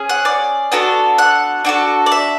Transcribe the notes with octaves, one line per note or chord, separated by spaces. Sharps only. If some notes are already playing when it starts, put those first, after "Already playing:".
Already playing: C#4 G#4
F#5
D5
B3 D4 F#4 A4
F#5
D4 F#4 A4
D5
E5